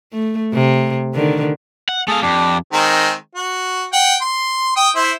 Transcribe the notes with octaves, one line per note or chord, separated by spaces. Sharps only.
A3
C3
D3 D#3
F#5
A3 G#4 A4 F5
F2 D4 G4
D#3 G#3 C4
F#4
F#5 G5
C6
G5 D#6
E4 C5